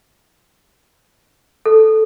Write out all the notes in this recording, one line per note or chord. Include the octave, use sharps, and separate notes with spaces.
A4